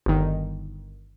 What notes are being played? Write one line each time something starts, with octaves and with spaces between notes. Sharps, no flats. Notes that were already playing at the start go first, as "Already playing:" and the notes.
G1 D#3